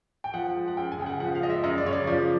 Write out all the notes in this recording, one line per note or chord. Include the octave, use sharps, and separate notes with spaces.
G5
F3 F#5
G#3
F#5
F#2 G5
G#5
C#3 G5
F#5
F3 F#5
F5
G#3 D#5
E5
F#2 D#5
D5
C#3 C#5
D5
F3 D5